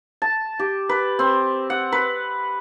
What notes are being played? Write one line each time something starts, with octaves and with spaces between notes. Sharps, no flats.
A5
G4
B4
C4
F#5
B4